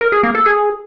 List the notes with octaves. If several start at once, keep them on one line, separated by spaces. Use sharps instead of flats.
A#4
G#4
A#3
A4
G#4